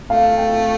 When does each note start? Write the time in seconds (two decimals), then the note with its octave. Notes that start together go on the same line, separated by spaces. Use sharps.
0.10 A3 F5
0.37 G5